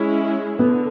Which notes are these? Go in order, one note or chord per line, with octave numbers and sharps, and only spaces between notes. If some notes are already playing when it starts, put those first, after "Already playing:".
Already playing: G#3 C#4 E4
D3 B3